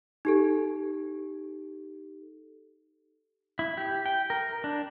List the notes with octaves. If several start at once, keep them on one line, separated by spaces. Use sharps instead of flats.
D#4 G4 A4
E4
G4
G5
A#4
D4